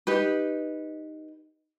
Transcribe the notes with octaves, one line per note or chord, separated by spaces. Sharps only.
D#4 G4 B4